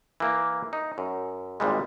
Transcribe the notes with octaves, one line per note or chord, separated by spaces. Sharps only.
E3 A#3
D#4
F#2
G#1 A#2 G3 G#3